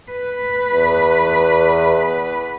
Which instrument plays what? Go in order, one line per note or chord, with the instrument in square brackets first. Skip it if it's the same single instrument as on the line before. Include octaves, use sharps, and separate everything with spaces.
[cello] B4
[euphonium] E2